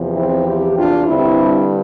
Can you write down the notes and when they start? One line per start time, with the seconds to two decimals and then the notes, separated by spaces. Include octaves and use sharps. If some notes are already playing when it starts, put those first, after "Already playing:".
Already playing: E2 C3 F3
0.16 C4 E4
0.46 E4 G4
0.76 D4 F4
1.06 G2 D3 G3 C4 E4